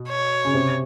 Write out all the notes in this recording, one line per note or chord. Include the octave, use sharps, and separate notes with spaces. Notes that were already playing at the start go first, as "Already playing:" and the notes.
Already playing: B2
C#5
C#3
C3